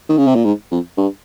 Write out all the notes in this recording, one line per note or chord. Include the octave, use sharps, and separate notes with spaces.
D#3
C#3
C3
A#2
G#2
F2
G2